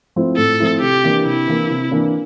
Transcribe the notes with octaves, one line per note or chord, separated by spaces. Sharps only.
F3 A3 C4 E4
A2 A4
F3 A3 C4 E4
C3 G4
E3 A#3 D4
C3 E4
E3 A#3 D4
C3
E3 A#3 D4